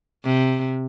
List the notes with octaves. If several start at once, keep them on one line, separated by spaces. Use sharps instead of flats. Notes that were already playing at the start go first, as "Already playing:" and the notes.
C3